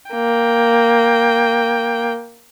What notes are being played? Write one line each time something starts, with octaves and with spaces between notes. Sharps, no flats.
A#3 G5